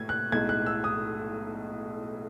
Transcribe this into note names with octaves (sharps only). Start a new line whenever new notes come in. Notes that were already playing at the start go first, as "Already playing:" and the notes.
Already playing: A2 G#6
F#6
B1 A2 G#3 D#4 G#6
F#6
E6
D#6